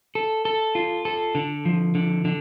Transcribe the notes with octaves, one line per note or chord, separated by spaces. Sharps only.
A4
A4
F4
A4
D3
F3
D3
D3